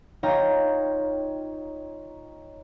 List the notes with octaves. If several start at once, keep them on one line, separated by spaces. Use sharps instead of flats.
D#4 F4 C#5 F5 G5 A#5